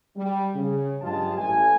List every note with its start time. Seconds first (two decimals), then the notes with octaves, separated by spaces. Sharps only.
0.16 G3
0.54 C#3
1.02 G2 F#3 G#3 F4 G4 A5
1.37 A1 A3 G#5